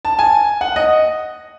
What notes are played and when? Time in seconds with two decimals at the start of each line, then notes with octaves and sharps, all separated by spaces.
0.05 A5
0.19 G#5
0.61 F#5
0.76 D#5